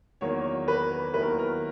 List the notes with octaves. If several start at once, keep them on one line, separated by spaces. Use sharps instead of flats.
E2 D#3 F#3 A#3 C#5
B4
D#2 D#3 F#3 B3 E4 B4
A#4
A#4